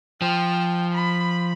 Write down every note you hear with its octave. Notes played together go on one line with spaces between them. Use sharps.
F3 G5
B5